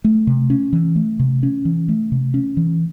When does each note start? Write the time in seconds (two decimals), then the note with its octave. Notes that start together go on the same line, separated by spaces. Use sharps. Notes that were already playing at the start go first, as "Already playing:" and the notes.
0.04 A3
0.27 C3
0.50 C#4
0.73 E3
0.96 A3
1.19 C3
1.43 C#4
1.65 E3
1.88 A3
2.12 C3
2.34 C#4
2.57 E3